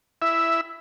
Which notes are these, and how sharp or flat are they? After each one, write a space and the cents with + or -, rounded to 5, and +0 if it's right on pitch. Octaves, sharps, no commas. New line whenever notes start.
E4 +10 E5 +0